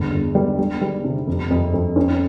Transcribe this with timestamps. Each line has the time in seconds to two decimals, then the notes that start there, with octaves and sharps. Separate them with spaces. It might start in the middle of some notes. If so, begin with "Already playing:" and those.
Already playing: G1 E2
0.12 G1
0.35 G3
0.59 G3
0.81 G3
1.04 C3
1.27 F2
1.50 F2
1.74 F2
1.96 C#4